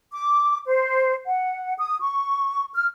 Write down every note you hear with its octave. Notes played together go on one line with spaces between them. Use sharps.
D6
C5
F#5
D#6
C#6
F6